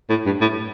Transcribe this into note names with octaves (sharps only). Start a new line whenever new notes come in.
A2
G2
A2